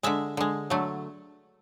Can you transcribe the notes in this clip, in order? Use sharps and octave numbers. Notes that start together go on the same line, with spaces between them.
D3 G#3 E5
D3 G#3
D3 F#3 A3